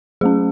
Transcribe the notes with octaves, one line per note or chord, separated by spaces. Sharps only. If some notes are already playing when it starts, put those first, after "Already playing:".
F#3 A3 C#4 G#4